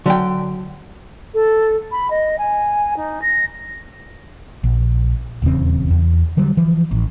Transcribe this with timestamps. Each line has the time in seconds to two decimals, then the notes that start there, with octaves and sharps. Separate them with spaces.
0.06 D3 F#3 G5
1.34 A4
1.92 B5
2.10 D#5
2.39 G#5
2.97 D#4
3.22 A#6
4.64 A#1
5.42 D#1 E2 C#3 C4
5.91 E2
6.37 D3 F#3 G3
6.57 E3 F3
6.91 A1